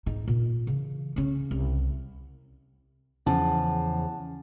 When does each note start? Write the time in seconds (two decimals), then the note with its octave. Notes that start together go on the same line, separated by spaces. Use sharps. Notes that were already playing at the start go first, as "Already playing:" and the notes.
0.06 G#2 D#4
0.27 A#2
0.67 C#3 E3
1.16 C#3 C#4
1.51 C2
3.26 E2 C#3 F3 C#4 F#5 A5